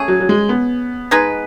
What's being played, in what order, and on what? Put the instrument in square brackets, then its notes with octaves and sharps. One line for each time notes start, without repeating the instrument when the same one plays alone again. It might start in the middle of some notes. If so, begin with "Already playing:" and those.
Already playing: [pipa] A3 C#4 G#4
[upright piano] F#3
F#3
G#3
B3
[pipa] G#3 D#4 G#4 B4